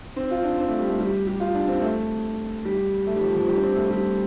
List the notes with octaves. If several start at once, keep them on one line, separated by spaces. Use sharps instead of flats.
C4
F4
D4
C4
A3
G3
A3
G3
G4
F4
D4
C4
A3
G3
A3
G3
F3
F3
G3
D4
C4
A3
G3